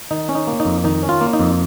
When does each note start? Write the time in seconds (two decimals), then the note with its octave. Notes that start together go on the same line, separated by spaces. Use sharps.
0.11 D#3 D#4
0.29 C#4
0.35 D#4
0.47 A#3
0.60 D#4
0.65 F2
0.84 D#3 D#4
1.03 C#4
1.09 F4
1.21 A#3
1.33 D#4
1.39 F2